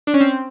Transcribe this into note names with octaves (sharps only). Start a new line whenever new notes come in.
D4
C#4
C4